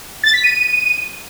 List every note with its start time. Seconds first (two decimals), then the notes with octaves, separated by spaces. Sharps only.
0.24 A6
0.34 B6
0.44 D#7